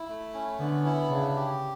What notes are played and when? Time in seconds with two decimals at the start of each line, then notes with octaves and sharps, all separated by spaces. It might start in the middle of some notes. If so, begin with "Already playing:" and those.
Already playing: E4
0.08 A3
0.34 C#4
0.59 D3 B3
0.84 E4
1.10 C#3 D4
1.35 G4